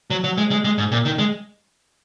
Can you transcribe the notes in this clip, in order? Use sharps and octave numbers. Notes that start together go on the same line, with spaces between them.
F#3
F#3
G#3
G#3
G#3
G#2
A#2
D#3
G#3